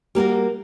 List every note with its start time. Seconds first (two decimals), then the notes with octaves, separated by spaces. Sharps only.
0.15 G3 A#3 F#4 G4 A#4